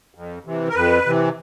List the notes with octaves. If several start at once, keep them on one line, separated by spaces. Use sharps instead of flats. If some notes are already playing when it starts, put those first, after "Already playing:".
F2
C3 E3
A#4
F2 B4
C3 E3